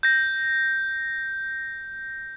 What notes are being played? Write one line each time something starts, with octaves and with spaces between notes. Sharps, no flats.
G6 A#6